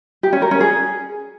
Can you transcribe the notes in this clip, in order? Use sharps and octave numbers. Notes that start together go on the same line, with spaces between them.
G4
C#4
A#4
C#4
G#4